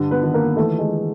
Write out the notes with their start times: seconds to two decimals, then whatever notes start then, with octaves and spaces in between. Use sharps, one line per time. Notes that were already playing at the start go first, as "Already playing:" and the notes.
Already playing: G2 D3
0.11 B3 B4
0.23 D#3
0.34 A#3 A#4
0.56 E3 A3 A4
0.79 G#3 G#4